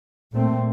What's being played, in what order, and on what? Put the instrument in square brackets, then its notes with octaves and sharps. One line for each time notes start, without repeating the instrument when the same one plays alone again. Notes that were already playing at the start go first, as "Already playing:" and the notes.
[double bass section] A#2 A3 C4